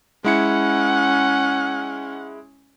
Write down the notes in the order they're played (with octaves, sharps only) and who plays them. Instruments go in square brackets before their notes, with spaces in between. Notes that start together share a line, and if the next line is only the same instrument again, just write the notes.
[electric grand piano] G#3 E4 C#7 [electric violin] C#4 [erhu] F#5